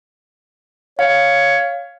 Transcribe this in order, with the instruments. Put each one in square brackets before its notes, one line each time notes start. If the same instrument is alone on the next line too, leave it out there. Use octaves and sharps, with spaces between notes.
[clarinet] C#5 [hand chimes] F5